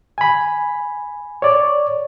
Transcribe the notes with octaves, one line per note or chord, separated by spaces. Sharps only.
G#5 B5
C#5 D5